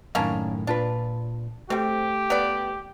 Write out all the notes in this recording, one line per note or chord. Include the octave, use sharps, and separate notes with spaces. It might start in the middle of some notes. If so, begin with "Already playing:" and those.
F#2 A2 D#3 A#3 C#4 D4
A#2 D4 F4 B4
G3 A3 C4 G4
B3 D5